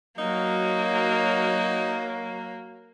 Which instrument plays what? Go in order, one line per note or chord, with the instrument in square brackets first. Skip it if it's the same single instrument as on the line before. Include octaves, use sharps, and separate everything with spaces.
[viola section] F#3 [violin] A#3 [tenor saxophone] D#4